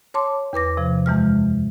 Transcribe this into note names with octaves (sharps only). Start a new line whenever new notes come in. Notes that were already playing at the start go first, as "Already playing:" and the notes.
C#5 A5 C6 D6
E2 B4 D6 A#6
C3 F3
F#2 E3 G#3 F6